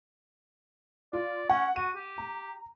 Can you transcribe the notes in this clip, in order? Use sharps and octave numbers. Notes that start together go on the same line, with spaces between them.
F4 D5
C#4 F#5
F#4 D#7
G4
A#5